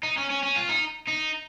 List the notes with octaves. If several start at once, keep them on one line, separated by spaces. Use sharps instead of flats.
D#4
C#4
C#4
C#4
F4
D#4
D#4